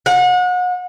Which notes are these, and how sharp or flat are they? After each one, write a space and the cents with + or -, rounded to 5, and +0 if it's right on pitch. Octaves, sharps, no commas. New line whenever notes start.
F#5 -35